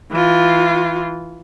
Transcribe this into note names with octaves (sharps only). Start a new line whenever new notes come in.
E3 F4